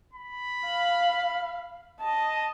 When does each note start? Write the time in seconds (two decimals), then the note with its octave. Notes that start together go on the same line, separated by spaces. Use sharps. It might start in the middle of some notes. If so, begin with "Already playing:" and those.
0.13 B5
0.67 F5
2.01 D#5 A5